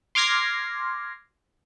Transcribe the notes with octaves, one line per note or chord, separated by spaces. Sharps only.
C6 D6 F6 G#6 A#6 C7